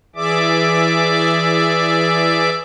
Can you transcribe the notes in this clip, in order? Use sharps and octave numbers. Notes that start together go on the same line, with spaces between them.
E3 G#4 D5 E5 D6